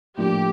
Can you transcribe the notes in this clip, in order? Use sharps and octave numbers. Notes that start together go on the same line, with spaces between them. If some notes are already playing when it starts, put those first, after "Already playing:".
A2 F3 A#3 D4 G4